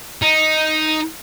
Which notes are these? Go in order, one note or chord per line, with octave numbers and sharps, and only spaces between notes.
D#4